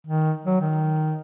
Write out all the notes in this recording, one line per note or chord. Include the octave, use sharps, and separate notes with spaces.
D#3
F#3
D#3